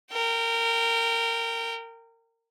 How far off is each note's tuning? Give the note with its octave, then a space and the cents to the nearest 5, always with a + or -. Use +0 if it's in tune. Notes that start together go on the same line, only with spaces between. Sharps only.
A#4 -20 G5 +0